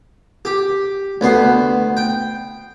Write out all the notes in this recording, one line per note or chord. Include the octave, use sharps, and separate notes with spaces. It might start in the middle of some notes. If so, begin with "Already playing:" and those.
G4
D2 B3 C6
G5